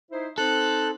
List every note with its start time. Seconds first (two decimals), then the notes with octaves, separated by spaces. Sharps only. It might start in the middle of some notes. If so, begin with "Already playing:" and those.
0.10 D#4 E4 C5
0.38 C4 D#4 A4 C5 F#6